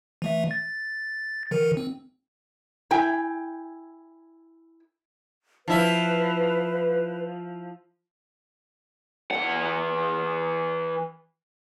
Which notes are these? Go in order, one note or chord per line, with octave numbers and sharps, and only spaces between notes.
E3 A3 E5
A6
D3 E3 A#4
C4
E4 G5 G#5
F3 E4 B4
E3 F#5